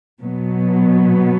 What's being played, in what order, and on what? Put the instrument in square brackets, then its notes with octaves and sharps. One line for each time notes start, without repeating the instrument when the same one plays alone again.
[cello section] B2 F#3 B3